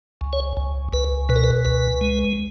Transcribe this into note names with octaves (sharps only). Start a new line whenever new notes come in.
C#2
C#5
C#2
C#2 B4
B2 B4
A#4
B4
C#2 B4
G#3